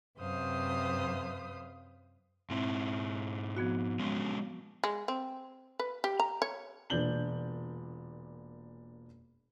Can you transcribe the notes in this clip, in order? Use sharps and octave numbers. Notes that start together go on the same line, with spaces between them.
F#2 C3 B4 C5 F5 D#6
G#2 C4 E4
F3 B3 F#4
F#3 G#3 C#4
G#3
C4
B4
G4
A#5
C#5
E1 A#2 D4 G6 F#7 G7